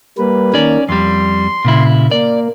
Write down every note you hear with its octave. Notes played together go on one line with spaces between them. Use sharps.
G3 A#3 B4
D#3 A#3 C#4 D5
F2 G3 C6
A#2 C#3 E4
A#3 D5